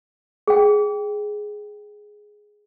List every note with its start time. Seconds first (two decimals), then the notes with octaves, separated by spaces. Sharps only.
0.47 G#4 G5